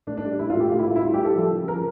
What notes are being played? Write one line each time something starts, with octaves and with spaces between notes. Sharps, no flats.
A2 D4
D4
G3
A2 E4
F4
A2
G4
A2 F4
E4
A2 F4
E4
G3 F4
G4
G3 A4
F3
C#3
F3 A#4